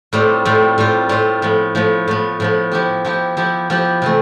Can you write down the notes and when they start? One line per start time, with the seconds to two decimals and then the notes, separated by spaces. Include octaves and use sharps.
0.13 A2 G3 C4 F4
0.45 A2 G3 C4 F4
0.78 A2 G3 C4 F4
1.09 A2 G3 C4 F4
1.42 A2 F3 B3
1.75 A2 F3 B3
2.08 A2 F3 B3
2.40 A2 F3 B3
2.72 F3 B3 E4 G4
3.04 F3 B3 E4 G4
3.37 F3 B3 E4 G4
3.70 F3 B3 E4 G4
4.02 C3 E3 A3